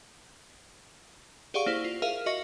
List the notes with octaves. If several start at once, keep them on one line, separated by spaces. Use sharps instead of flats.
G4 G#4 D5 F5 F#5 C#6
A#3 E4 C5
F4
G#4 A#4 E5 F5 F6
F#4 D#5 E5 C#6 A#6 C#7